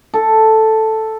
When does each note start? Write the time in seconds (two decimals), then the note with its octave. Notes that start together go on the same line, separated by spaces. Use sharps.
0.14 A4